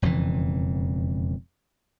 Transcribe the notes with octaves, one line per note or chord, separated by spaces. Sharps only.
E1 F2 C#3 E3